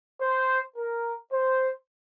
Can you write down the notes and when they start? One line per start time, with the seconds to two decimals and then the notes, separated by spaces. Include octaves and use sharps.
0.21 C5
0.76 A#4
1.31 C5